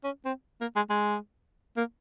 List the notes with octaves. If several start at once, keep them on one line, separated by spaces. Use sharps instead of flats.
C#4
C4
A#3
G#3
G#3
A#3